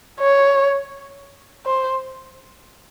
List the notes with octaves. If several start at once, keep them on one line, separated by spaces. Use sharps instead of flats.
C#5
C5